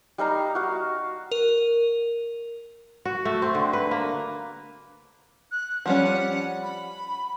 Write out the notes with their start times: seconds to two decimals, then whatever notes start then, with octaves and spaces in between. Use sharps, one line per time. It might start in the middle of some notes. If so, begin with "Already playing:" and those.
0.18 G3 D#4 F5 A#5
0.55 F#4 F5
1.31 A#4
3.05 F#4
3.25 A3
3.42 C4
3.55 D3
3.73 B4
3.91 A#3
5.52 F#6
5.86 F3 G3 C#4 F#5
6.63 B5